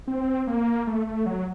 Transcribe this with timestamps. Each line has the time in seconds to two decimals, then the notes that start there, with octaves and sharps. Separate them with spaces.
0.08 C4
0.47 A#3
0.87 A3
1.07 A3
1.26 F#3